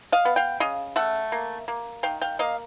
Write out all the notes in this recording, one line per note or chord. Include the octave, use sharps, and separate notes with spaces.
D#5 F5
B3
F5 G5
C#3 D#5 F5
A3 E5 F#5
A#3
A#3
D#3 F5 G5
F5 G5
A#3 D#5 F5